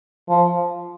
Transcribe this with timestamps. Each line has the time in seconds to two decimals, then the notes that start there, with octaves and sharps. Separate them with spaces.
0.29 F3